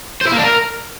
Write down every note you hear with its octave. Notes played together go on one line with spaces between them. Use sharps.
C5
E4
A#3
D4
A#4